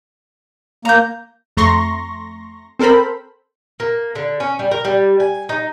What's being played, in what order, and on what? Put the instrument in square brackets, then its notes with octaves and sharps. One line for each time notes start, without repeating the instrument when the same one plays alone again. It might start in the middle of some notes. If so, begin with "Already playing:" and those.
[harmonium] A#3 [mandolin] A#5 G6
[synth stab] F2 A3 A#5 C6 C#6 A#6
C4 A4 A#4 C5 B5
[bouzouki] A#3
D3
C#4
G3
A#4
G3
G#5
D#4